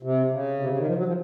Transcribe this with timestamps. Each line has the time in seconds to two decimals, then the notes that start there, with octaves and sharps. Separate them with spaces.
0.03 C3
0.32 C#3
0.59 C3
0.69 C#3
0.78 D#3
0.87 F3
0.97 F#3
1.06 F3